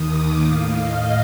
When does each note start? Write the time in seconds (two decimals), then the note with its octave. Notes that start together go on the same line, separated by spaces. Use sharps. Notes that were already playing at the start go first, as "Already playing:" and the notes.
Already playing: D#2 D#3 D#6
0.08 D6
0.42 A2 F5
0.77 D#5